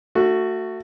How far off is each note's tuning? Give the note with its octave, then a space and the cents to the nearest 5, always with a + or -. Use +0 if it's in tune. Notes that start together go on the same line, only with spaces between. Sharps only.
A3 +20 F#4 +0